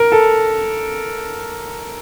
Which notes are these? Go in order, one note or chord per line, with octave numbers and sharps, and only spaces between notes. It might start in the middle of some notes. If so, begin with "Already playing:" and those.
Already playing: A#4
A4